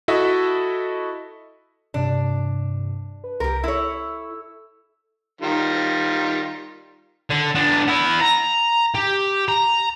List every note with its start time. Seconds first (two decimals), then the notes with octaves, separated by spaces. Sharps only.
0.08 E4 F#4 A4 D#5 E5
1.94 G2 C3 D4
3.24 B4
3.40 C2 G4 A#4
3.64 E4 A4 C#5 E6
5.41 D#3 G3 F4
7.30 D3
7.55 B3 D4
7.87 B3 E4
8.21 A#5
8.95 G4
9.48 A#5